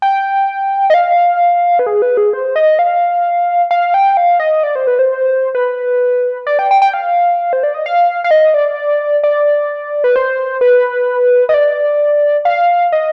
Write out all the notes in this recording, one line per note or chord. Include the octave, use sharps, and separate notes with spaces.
G5
D#5
F5
B4
G#4
B4
G#4
C5
D#5
F5
F5
G5
F5
D#5
D5
C5
B4
C5
B4
D5
G5
G5
G5
F5
C5
D5
D#5
F5
F5
D#5
D5
D5
B4
C5
B4
D#5
D5
F5
D#5